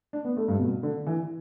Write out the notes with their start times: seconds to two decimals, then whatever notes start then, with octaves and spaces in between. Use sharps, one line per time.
0.13 D4
0.25 B3
0.37 A3
0.48 G2
0.59 B2
0.83 D3
1.06 E3